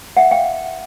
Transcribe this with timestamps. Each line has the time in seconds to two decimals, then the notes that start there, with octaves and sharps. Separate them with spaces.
0.17 E5 F#5
0.31 F5 G5